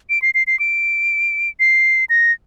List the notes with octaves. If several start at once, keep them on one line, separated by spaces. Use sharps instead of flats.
D7
C7
C7
C7
D7
C7
A#6